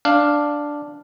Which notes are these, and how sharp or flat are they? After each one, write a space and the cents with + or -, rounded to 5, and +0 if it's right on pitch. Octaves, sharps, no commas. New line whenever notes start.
D4 +0 F5 +0